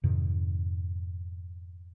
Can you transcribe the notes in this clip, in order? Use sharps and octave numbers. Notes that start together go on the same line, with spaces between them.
F2 G#2 C3 D#3